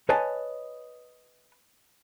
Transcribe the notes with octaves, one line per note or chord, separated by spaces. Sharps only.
B4 C#5 D#5 G#5 A5